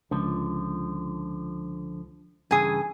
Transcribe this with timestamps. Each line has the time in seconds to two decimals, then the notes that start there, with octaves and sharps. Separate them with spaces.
0.11 C#2 D3 F3
2.51 G2 C#3 E3 G#4 G#5